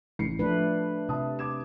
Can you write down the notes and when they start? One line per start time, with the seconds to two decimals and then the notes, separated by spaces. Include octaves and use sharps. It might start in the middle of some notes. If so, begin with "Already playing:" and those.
0.19 A1 C7 C#7
0.39 F3 A3 D4 B4
1.09 C3 E5 A5 D#6
1.39 D6 G#6 E7